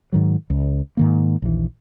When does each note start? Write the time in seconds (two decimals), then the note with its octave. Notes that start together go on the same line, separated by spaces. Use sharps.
0.12 G#2 D#3 F#3
0.50 C#2
0.97 G#2 D#3 A#3
1.42 A#1 D#2 E3